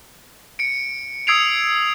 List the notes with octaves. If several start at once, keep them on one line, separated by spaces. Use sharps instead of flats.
C#7 D7
D#6 E6 G#6 C7 D7 F7